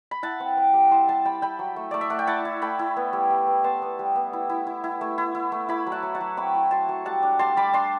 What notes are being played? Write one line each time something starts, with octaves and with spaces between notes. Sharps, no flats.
B5
E4 F#5 A5
C4
C4
G3
E4 A5 C6
G3 A5 C6
G3 G5 B5
E4 G5 B5
F#3
A3
A3 D5
E5
A3 F#5
G5
E4 F#5 A5
E4
A3 G5 B5
E4
B3
G3
G3
B3
B3 A5 C6
B3
G3
B3
E4
E4
E4
E4
A3
E4
E4
A3
E4 B5 D6
F#3
F#5 A5
F#3
F#5 A5
F#3
C4 B5 D6
E4
F#3 A5 C6
F#3
G3 F#5 A5
D4
G3 A5 C6
G3 B5 D6
D4 A5 C6